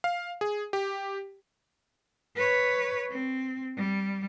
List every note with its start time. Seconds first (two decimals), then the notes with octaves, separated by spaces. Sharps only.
0.04 F5
0.41 G#4
0.73 G4
2.36 B4 C#5
3.10 C4
3.77 G3